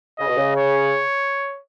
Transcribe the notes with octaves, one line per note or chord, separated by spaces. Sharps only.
C#3 D#5
B2
C#3
C#5